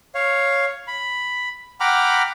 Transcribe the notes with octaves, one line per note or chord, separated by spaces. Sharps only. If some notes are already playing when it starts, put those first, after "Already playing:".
C#5 F5
B5
F#5 G5 A#5 B5 D6 F6